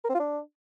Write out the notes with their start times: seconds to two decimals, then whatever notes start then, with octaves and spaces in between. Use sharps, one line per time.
0.04 A#4
0.09 C4
0.14 F4
0.20 D4